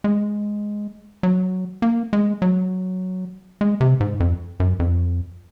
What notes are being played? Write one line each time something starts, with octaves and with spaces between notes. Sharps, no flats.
G#3
F#3
A#3
G#3
F#3
G#3
C3
G#2
F2
F#2
F2